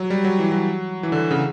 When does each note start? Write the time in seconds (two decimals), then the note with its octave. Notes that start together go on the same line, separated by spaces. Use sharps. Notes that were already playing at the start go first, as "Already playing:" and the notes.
Already playing: F#3
0.10 G3
0.25 F#3
0.39 E3
0.52 F#3
1.03 E3
1.12 D3
1.31 C#3